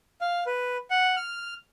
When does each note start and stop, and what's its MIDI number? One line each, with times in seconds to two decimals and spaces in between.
0.21 0.44 77
0.46 0.77 71
0.90 1.16 78
1.17 1.54 89